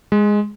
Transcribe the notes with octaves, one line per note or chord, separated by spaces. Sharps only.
G#3